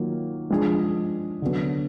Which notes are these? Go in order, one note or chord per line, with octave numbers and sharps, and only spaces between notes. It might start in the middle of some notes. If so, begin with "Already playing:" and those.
Already playing: D#3 F#3 A#3 F4
F3 G#3 D4 G#4
D3 F#3 B3